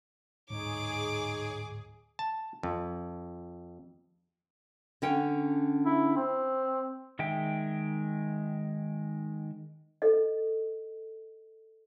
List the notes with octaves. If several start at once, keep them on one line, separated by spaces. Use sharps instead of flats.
D1 G#2 G#3 D#4 G#4 C#5 D6
A5
F2
D3 C#4 G5
E4
C4
D#3 G#3 E5 G5
A4 D#5